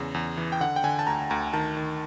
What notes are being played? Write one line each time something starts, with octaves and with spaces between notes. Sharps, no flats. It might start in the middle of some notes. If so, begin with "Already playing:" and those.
Already playing: E2 C#3
E2
E3
G5
D3 F#5
G5
D3 G#5
A5
D2 A#5
D2 A#5
D#3 A5
D#3